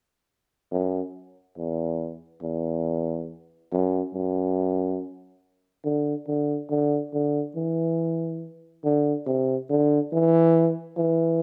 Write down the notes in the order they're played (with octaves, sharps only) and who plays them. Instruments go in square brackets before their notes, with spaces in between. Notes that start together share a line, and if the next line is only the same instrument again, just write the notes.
[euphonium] F#2
E2
E2
F#2
F#2
D3
D3
D3
D3
E3
D3
C3
D3
E3
E3